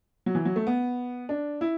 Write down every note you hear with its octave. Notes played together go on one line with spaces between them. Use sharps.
F#3
E3
F#3
A3
B3
D4
E4